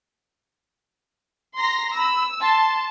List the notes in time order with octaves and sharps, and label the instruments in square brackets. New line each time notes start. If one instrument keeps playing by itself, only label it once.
[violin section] A#5 C6 A#6
[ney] B5 [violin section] E6
[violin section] A5 [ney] C6